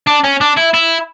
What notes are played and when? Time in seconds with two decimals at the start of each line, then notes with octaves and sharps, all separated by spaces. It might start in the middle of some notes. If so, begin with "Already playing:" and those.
0.07 D4
0.24 C#4
0.41 D4
0.57 E4
0.74 E4